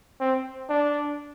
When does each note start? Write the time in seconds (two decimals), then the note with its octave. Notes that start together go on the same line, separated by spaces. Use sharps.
0.20 C4
0.69 D4